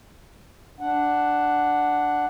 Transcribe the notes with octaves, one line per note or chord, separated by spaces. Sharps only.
D4 F#5